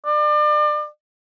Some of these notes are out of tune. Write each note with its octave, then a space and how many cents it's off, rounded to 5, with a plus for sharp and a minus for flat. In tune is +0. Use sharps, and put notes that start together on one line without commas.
D5 +35